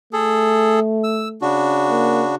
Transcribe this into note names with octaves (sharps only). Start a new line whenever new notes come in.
A3 G#4 A4
E6
C#3 D4 F#4
A#3